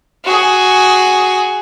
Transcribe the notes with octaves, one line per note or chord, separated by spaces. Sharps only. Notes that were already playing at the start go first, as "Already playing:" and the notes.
F#4 G#4